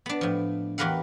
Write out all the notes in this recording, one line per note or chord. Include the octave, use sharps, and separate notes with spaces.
B3 D4
A2 F3
E2 G4 A#4 B4 F5 F#5